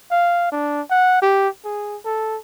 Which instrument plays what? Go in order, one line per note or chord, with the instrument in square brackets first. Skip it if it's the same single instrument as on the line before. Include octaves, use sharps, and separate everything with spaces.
[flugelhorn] F5
D4
F#5
G4
G#4
A4